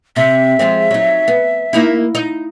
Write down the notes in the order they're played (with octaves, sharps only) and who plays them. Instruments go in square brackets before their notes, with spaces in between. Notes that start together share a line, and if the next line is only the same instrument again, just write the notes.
[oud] C3 [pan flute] E5
[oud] F3 G#3 C4
F#3 D#4
B3
A#3 D#4 E4
D#4